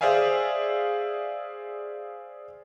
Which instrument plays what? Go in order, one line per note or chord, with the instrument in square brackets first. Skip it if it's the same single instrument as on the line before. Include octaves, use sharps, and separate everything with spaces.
[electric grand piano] G#4 C5 D5 E5 F5 G#5